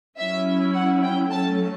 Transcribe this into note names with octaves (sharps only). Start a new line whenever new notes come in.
F#3 C#4 E4 E5
F#5
G5
F#3 A3 C#4 A5